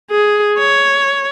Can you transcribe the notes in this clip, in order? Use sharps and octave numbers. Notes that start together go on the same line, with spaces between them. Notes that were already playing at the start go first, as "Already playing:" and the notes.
G#4
C#5